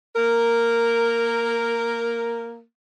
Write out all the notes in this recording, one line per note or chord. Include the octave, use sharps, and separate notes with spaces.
A#3 A#4